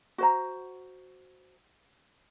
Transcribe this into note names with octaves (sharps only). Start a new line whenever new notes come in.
F#4 C5 A#5